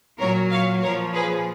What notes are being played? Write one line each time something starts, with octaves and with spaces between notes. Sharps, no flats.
A#2 F#3 A#4 C#5
C#5 F5
A#2 F3 A#4 C#5
G#4 B4